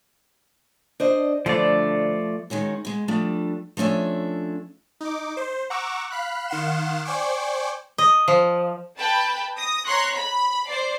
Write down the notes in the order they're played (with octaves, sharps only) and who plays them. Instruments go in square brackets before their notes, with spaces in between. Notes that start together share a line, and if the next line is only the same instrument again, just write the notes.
[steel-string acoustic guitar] D4 C5 D#5
[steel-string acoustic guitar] G2 D3 C5 [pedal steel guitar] F3 A3 D5
[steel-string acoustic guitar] D#3 G#3 C#4 F#4
B2 G#3
F3 G3 A3 D4
F3 A3 C#4 D4 E5
[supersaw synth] D#4 D6
C5
F#5 A#5 C#6 D6 E6
F5 B5 F#6
D#3 F5 F#5 C6 E7
C5 D5 G5 G#5 C#6 D6
[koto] D#5
F3
[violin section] B4 G5 A5 B5
D#6 A#6
C#5 A#5 C6 C#6 F#6
B5
C5 D5 C7